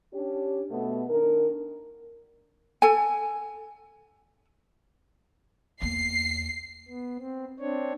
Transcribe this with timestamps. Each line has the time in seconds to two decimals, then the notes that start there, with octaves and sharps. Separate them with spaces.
0.13 C#4 D4 G4
0.70 B2 A3 B3
1.09 D#3 D4 A#4
2.82 A4 G#5
5.82 E2 A#3 C7
6.88 B3
7.19 C4
7.60 C4 D4 C#5